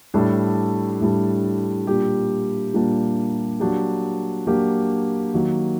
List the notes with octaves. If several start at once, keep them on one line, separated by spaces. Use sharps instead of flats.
A2 G3 D4 A4
A2 G3 D4 A4
A#2 G3 A#3 D4 G4
A#2 G3 A#3 D4 G4
F#3 A#3 D4 G4
F#3 A#3 D4 G4
D#3 F#3 A#3